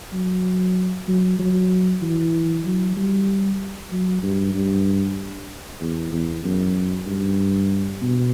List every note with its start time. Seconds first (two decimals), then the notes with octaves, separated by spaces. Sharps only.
0.14 F#3
1.08 F#3
1.39 F#3
2.02 E3
2.66 F#3
2.97 G3
3.92 F#3
4.23 G2
4.55 G2
5.81 E2
6.13 E2
6.44 F#2
7.07 G2
8.02 B2